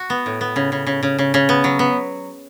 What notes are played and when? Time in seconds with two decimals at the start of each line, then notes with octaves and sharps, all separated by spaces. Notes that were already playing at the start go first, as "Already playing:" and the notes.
Already playing: F#4
0.10 B3
0.26 A2
0.41 B3
0.56 C#3
0.72 C#3
0.87 C#3
1.03 C#3
1.18 C#3
1.34 C#3
1.49 B3
1.64 F#3
1.79 B3